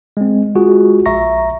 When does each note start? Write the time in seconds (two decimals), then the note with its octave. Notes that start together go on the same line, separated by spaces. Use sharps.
0.17 G#3 C4
0.55 G#3 F4 F#4 G#4
1.06 A#1 E5 A#5 C#6 A#6